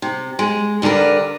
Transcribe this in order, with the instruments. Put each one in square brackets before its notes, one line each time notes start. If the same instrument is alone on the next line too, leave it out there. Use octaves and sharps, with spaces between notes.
[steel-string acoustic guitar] C3
G#3
G2 D3 F4 A#4 B4